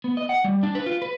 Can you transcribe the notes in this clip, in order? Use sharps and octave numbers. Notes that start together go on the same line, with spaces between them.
B3
D#5
F#5
G3
D4
B4
F4
B4